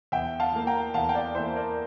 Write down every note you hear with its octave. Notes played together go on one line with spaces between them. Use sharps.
E2 E5 G5
F5 A5
E3 A#3
G5 A#5
E2 F5 A5
G5
D5 F5
E3 A#3 C5 E5
A#4 D5